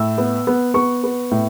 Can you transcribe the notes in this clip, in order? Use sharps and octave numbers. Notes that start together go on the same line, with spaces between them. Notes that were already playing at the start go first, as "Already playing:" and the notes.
Already playing: A2 E6
B3
B3
B3 C#6
B3
A2